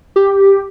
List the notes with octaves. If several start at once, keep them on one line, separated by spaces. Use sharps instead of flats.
G4